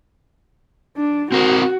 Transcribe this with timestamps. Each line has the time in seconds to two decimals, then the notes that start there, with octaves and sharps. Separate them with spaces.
0.97 D4
1.32 C4 F#4 A#4 C5